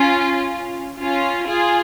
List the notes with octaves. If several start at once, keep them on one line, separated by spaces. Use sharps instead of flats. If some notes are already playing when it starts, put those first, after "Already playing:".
Already playing: C#4 F4
C#4 F4
F4 G#4